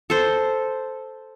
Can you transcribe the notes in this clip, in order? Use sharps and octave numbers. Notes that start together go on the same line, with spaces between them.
A4 C5